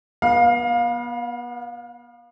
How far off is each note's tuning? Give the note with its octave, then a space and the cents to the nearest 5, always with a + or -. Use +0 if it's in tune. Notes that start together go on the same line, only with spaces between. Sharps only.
B3 -35 F5 +20